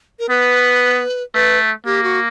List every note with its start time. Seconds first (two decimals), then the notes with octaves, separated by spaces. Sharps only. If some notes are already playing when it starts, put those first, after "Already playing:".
0.19 A#4
0.29 B3 B4
1.34 A3 B4
1.86 A#3 G4
2.03 F#4